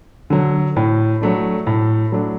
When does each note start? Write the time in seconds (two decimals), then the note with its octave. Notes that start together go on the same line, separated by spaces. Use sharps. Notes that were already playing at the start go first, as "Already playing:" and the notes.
0.30 D3 F#3
0.76 A2
1.21 F#3 A3 D4
1.67 A2
2.12 F#3 A3 D4